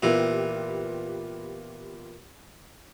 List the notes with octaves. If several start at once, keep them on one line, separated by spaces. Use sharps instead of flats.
A#2 E3 B3 F4 G4